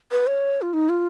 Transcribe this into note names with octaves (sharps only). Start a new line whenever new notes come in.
B4
C#5
F4
D#4
F4